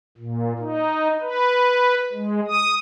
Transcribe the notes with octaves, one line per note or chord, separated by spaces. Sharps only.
A#2
D#4
B4
G#3
D#6